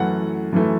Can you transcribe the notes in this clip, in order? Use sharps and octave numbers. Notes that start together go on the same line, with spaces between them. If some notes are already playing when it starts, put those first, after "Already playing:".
Already playing: F#2 E3 A3 F#5
F#2 E3 A3